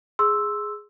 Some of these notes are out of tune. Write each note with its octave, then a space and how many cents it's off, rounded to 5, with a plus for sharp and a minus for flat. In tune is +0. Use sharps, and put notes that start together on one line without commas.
G#4 +0 C6 +10 E6 +0